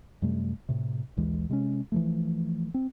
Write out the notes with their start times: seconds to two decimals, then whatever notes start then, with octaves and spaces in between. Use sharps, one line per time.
0.22 F#2 C3 G3 A3
0.69 A2 C3
1.17 A#1 D#2 E3 G#3
1.49 C3 G#3 A#3 C#4
1.92 E3 F3 A3
2.74 C4